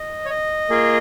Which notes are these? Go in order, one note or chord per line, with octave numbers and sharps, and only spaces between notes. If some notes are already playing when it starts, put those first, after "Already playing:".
Already playing: D#5
C#5
D#5
A#3 F4 G#4